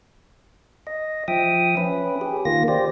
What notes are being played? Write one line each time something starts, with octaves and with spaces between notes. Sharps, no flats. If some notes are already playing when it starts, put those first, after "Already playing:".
D#5
F3 E5 G5 D#6
C#4 B4
G4 G#4
D#3 A#3 F4 A#6
G4 C5 D5